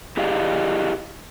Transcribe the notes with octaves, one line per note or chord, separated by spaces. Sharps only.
E4 G4 G#4 D5 D#5 F5